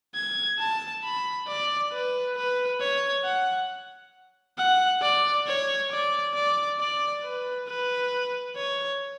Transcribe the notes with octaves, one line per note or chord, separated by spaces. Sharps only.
G#6
A5
B5
D5
B4
B4
C#5
F#5
F#5
D5
C#5
D5
D5
D5
B4
B4
C#5